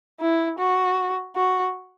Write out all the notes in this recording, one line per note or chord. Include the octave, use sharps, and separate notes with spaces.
E4
F#4
F#4